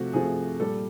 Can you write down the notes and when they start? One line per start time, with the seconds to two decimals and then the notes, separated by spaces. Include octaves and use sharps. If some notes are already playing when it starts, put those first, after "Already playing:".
Already playing: C3 F3 A3 F#4
0.13 C3 F3 A3 G#4
0.60 A#2 G3 A4